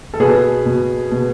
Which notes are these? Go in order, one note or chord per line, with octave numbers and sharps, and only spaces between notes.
A4
B2 G#4 B4
B2
B2